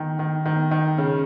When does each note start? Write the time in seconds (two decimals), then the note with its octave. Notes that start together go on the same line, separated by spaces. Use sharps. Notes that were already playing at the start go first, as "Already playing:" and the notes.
Already playing: D#3
0.19 D#3
0.46 D#3
0.71 D#3
0.98 C#3